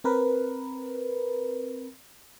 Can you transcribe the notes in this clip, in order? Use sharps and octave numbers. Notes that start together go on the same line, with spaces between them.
C4 A#4 B4